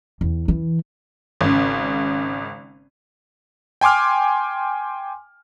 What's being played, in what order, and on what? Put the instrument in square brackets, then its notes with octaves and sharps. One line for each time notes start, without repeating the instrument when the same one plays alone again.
[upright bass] E2
E3
[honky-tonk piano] G#1 C#3
[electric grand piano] G5 G#5 C6 D6 F6